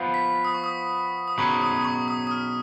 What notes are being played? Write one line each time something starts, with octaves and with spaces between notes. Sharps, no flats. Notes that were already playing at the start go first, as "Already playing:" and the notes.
Already playing: F3 B3 F4
B6
D#6
C#6
D#6
D#6
B2 F#3 C#4 G#4 B4 C#6
D#6
D#6
C#6
D#6
D#6
F6